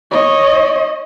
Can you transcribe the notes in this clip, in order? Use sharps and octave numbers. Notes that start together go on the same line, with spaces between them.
C#5 D#5